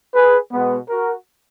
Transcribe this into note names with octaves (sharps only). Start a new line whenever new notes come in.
G#4 B4
B2 G#3 B3
F#4 A#4